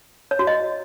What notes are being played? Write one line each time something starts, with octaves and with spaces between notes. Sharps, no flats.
C#5
F#4
D#5